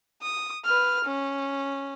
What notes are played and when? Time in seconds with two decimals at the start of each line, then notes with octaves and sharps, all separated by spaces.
0.22 D#6
0.65 B4 F6
1.05 C#4